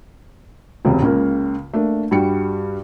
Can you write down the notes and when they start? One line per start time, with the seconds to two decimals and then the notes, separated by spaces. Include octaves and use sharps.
0.85 E1 C#2 C3
1.02 C#2 C#3 A#3
1.74 A3 A#3 D4
2.11 G2 G3 F#4 G5 C#7